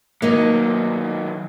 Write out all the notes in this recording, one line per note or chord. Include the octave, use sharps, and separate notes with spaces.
D#3 F#3 A#3 D#4 D#5